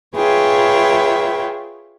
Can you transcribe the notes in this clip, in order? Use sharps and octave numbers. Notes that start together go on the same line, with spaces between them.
F4 G#4 B4 C#5 E5 G5